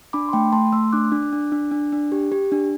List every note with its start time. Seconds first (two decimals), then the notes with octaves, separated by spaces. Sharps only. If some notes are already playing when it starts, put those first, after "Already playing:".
0.13 D4 B5 D6
0.29 C6
0.33 A3 G5 B5
0.52 A3 A5 C6
0.72 A3 C6 E6
0.93 D4 D6 F#6
1.12 D4
1.33 D4
1.52 D4
1.71 D4
1.92 D4
2.12 G4
2.32 G4
2.52 D4